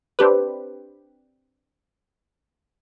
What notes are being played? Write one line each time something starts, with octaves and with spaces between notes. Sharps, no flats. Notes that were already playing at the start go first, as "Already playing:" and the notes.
C4 D4 G4 B4